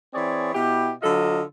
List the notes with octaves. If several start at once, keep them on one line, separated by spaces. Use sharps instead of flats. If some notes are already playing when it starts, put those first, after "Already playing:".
E3 C4 G#4 C#5 D5
B2 E4 G4
D3 F#3 F4 A4 D#5